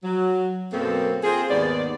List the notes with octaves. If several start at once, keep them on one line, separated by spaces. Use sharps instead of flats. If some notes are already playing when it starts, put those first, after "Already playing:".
F#3
F#2 B2 A#3 C4 A4
C4 F4 G#4
D#2 G#2 B3 D5